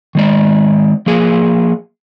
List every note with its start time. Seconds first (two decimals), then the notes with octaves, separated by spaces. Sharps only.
0.15 D#3 G#3 D5
1.06 F3 A#3 G#4